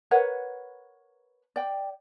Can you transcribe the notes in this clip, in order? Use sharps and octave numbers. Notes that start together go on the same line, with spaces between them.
A#4 B4 C#5 F#5
D5 G5